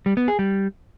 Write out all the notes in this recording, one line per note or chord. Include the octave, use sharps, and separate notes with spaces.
G3
B3
G#4
G3